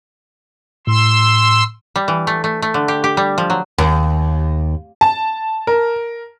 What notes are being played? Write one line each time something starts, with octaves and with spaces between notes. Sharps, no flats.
A2 C6 E6
G3
E3
A3
A3
A3
D3
G4
G4
G3
F3
F#3
D#2
A5
A#4